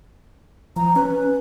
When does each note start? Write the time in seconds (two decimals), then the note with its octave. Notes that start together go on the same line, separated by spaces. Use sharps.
0.76 F3 A#5
0.96 C#4 B4